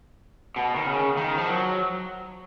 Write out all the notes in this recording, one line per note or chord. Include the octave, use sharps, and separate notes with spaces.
B2
D#3
C#3
D#3
F3
F#3